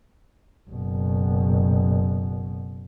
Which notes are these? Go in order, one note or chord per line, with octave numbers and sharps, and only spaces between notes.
F#1 B2